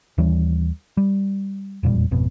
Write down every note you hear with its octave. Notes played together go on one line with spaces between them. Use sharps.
D#2 E3 G3 C#4
G3
E1 F2 A#2 G3
G#1 F2 B2